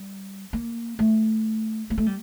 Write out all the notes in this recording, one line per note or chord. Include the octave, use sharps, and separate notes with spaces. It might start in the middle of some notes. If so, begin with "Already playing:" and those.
Already playing: G3
A#3
A3
A#3
A3
G3